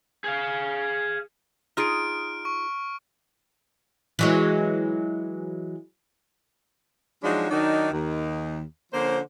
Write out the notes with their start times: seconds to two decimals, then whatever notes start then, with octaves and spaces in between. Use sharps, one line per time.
0.24 G#4 F5
1.77 D#4 F4 G#4 F6 D7
2.45 C#6
4.19 E3 F#3 G#3
7.23 F3 F#3 G#3 D4 D#4 F#4
7.50 D#3 F#3 D4 D#4
7.92 D#2 D#3
8.93 D3 F3 A#3 C#4 C5